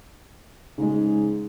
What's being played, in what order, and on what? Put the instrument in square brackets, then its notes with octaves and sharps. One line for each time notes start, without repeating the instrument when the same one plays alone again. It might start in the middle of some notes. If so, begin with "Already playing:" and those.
[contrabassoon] G#2 [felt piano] C#3 G#3